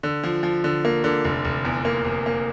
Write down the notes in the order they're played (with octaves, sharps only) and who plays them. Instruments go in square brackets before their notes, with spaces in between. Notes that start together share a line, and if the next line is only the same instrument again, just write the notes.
[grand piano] D3
F3
F3
D3
A#3
D3
F1
F1
E2
A#3
F1
A#3